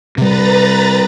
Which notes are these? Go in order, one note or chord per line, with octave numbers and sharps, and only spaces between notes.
C3 G3 B4 A#5 A6